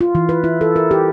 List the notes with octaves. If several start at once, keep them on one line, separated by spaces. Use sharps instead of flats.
F4
E3
B4
E4
A4
A#4
G4